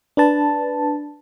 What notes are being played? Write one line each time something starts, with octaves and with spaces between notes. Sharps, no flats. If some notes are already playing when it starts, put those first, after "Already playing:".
D4 B4 A5